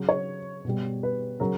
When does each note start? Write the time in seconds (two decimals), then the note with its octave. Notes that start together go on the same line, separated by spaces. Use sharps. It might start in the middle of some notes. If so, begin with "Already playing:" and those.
Already playing: C#3 F#3
0.09 C#5
0.65 B2 G3
1.03 B4
1.40 C#3 F#3 A#4